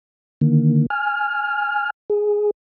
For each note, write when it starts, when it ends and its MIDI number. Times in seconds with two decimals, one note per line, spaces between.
0.41 0.86 50
0.41 0.86 51
0.41 0.86 58
0.90 1.90 80
0.90 1.90 89
2.10 2.51 68